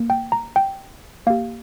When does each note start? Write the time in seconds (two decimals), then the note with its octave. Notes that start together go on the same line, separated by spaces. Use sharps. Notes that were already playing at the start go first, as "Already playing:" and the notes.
Already playing: A#3
0.10 G5
0.32 A#5
0.56 G5
1.27 A#3 G4 F5